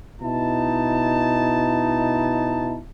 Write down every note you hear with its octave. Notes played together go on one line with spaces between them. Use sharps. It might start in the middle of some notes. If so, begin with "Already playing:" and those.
B2 D#4 E4 A5